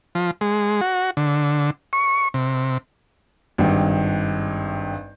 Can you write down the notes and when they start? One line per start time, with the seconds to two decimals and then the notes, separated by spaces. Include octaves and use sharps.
0.15 F3
0.41 G#3
0.81 F#4
1.17 D3
1.93 C#6
2.34 C3
3.58 G#1 G2